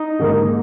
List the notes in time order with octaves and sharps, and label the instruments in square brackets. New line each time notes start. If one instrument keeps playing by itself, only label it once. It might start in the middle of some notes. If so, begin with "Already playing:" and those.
Already playing: [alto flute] D#4
[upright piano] G#2 D#3 A#3